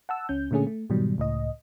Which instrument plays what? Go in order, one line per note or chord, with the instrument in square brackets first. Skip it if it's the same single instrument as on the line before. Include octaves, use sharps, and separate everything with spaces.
[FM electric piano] F#5 A5 E6
C#2 C#4 G6
A#2 D3 A3 C#4 G#4
A3
G#2 B2 D#3 F#3 G3
C#2 A2 D#5